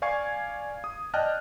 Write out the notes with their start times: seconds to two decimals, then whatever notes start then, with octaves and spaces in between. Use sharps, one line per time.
0.02 D5 F5 G#5 C#6 G#6 C7
0.84 D#6
1.14 D5 D#5 G5 A5 F6 F#6